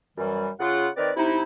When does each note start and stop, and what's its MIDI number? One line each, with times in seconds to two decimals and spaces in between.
0.17 0.49 42
0.17 0.49 52
0.17 0.49 55
0.60 0.88 49
0.60 0.88 65
0.60 0.88 78
0.97 1.10 51
0.97 1.10 60
0.97 1.10 70
0.97 1.10 71
0.97 1.10 74
1.16 1.43 48
1.16 1.43 63
1.16 1.43 64